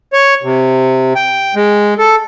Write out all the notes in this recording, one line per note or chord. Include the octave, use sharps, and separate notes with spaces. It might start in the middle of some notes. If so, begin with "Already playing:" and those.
C#5
C3
G5
G#3
A4